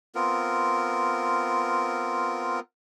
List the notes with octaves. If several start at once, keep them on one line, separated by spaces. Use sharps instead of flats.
B3 C4 F4 A#4